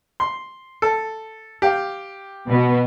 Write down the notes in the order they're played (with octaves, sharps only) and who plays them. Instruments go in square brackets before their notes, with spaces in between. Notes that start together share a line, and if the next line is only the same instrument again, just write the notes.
[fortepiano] C6
A4
G4 F5
[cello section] B2 B3